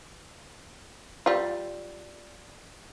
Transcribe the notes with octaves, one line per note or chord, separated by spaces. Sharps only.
G3 F4